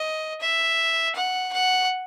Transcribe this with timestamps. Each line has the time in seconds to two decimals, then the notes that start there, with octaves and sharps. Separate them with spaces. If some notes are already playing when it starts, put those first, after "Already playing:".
Already playing: D#5
0.40 E5
1.15 F#5
1.52 F#5